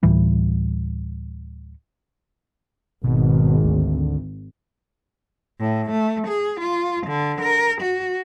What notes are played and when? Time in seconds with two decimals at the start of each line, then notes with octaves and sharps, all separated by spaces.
0.03 D2 A2 E3 G3
3.04 G#1 B2
3.64 D2
5.61 A2
5.91 A3
6.28 G#4
6.61 F4
7.08 D3
7.42 A#4
7.82 F#4